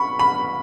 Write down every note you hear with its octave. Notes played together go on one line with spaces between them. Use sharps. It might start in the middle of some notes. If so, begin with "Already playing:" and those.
Already playing: B5 C#6
B5